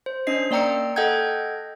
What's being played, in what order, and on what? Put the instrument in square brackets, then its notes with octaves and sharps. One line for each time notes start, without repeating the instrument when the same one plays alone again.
[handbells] C5
C#4 D4 D#5 C7
A#3 D5 G5 A#5 E6 C#7
A4 D#5 F#5 G5 G6 G#6